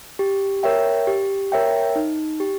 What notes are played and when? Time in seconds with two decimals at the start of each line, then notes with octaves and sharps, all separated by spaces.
0.19 G4
0.63 A#4 C#5 E5 G5
1.07 G4
1.52 A#4 C#5 E5 G5
1.96 D#4
2.40 G4